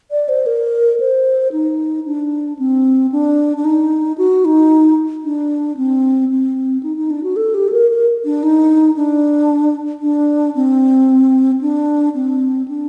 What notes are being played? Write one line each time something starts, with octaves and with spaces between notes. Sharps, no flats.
D5
C5
A#4
C5
D#4
D4
C4
D4
D4
D#4
F#4
D#4
D4
C4
C4
D#4
D#4
D4
F#4
A4
G4
A4
A#4
A#4
D4
D#4
D4
D4
C4
D4
C4
D4